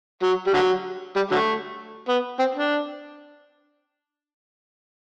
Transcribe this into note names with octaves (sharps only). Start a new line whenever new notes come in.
F#3
G3
D3 F#3
G3
D3 F#3 A3
B3
C4
D4